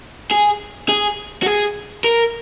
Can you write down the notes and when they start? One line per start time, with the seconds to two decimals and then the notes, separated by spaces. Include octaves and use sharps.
0.31 G#4
0.89 G#4
1.42 F#4
1.46 G#4
2.04 A#4